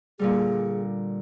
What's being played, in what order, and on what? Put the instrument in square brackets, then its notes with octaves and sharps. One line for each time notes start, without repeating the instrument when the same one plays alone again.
[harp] A#2 D3 G3 [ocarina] G#4